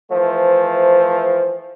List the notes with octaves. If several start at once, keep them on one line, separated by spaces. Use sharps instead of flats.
E3 F3 A3 C5